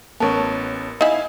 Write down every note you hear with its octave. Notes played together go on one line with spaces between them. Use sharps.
A1 B3 C#4 A#4 A5
D#4 E4 F5 G#5